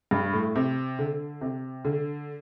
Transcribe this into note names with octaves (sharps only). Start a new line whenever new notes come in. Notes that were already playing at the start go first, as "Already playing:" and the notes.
G2
A2
C3
D3
C3
D3